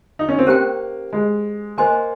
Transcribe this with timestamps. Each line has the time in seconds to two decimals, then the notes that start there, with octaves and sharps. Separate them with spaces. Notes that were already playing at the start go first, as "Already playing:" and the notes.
0.19 D#4
0.29 C#4
0.39 C4
0.47 A#3 C#4 G4 C5 G5
1.13 G#3
1.78 A#3 C5 D#5 G#5 C6